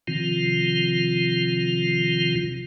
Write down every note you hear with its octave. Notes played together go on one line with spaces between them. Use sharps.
C3 D#3 F3 C4 F4